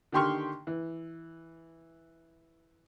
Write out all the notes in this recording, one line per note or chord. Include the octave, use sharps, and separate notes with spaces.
D3 D#3 G4 C6 C#6 F6
E3